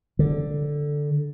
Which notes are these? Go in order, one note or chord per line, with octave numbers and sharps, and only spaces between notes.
D3